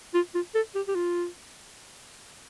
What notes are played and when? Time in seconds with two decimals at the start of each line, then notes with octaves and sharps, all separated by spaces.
0.14 F4
0.34 F4
0.55 A4
0.75 G4
0.88 G4
0.95 F4